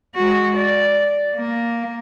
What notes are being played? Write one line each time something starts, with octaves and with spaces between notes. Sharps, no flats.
G#3 F#4
D5
A#3